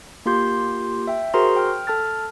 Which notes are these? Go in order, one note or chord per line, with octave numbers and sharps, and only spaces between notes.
A#3 F4 G4 C6 G6
E5 G5
F#4 G#4 A#4 C5 A#5 C6
G5 F6
A4 A5 F6 A6